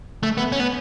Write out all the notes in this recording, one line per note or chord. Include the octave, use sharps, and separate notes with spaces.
A3
B3
C#4
B3